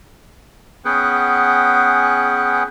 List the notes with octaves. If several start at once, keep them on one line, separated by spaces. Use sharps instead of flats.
B3 C#4 G#4 B4 F#5 G5